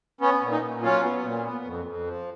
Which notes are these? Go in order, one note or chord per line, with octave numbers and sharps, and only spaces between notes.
B3 C#4
A#2
D#4
A#2
F#3 C#4 F4
B3
A#2
B3
F2
F2
F3